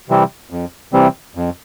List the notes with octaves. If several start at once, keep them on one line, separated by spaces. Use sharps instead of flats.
C3 E3 G3 C4
F2
C3 E3 G3 C4
F2